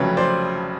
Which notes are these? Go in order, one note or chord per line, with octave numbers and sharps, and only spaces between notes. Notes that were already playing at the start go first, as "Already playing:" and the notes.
Already playing: F1 F2 C#3 F#3 A3 B4 C#5
C5 D5